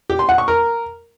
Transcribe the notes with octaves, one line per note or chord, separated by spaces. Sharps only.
G4
C6
F#5
C#6
A#4